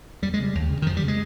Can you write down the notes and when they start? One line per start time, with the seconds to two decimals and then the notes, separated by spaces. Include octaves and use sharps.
0.22 F2 G3
0.34 G#3
0.39 C#3 G3
0.55 D#2
0.70 C#3
0.82 D#3
0.86 F2 F3
0.97 G3
1.02 C#3
1.08 G#3